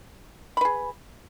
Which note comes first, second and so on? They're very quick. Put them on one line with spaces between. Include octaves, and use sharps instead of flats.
B5 B4 G#4